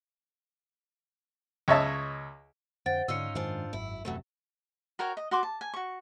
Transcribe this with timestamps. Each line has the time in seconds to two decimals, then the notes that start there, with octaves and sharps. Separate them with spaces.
1.68 C#2 C#5 D#5 E5 A5
2.86 F2 D3 C5 F#5 G5 A6
3.08 G#2 D3 C#4 D#4 F4 E6 C#7
3.35 F#2 D#3 G#3 D4 F4 C5
3.73 G#1 F#2 E4
4.05 D#1 F#2 C3 E3 F#3 A3
4.99 F#4 A#4 C#5 G5
5.17 D#5
5.31 F#4 C6 D6
5.43 A5
5.61 G#5
5.74 F#4 C#6